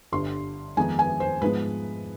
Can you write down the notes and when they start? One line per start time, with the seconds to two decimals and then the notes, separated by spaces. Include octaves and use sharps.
0.12 G1 G2 D3 C6
0.77 F2 D#3 G#3 B3 D#4 G#5
0.99 G#5
1.20 C5
1.41 G#2 F3 G#3 B3 B4